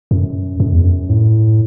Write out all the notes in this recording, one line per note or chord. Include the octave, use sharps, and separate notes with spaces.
F#2
F#2
E2
F#2
A2